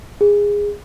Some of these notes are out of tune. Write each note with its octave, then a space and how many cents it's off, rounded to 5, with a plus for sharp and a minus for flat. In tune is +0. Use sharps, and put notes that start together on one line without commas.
G#4 -20